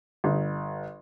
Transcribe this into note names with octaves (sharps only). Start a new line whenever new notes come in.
G1